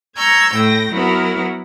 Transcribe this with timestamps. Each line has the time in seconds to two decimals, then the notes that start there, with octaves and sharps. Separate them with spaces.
0.16 A#5 C#6 E6 G6 G#6
0.55 A2 G5 A#6
0.92 F#3 B3 E4 F#4 A#4